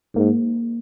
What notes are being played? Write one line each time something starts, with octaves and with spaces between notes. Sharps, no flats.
G#2 A#3